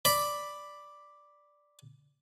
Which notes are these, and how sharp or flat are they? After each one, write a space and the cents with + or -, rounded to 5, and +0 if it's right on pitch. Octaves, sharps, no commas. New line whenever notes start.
D5 +0 B5 +0